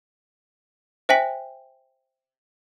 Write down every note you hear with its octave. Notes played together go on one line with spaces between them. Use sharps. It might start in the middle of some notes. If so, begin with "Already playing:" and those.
C5 E5 G5 G#5 B6 F#7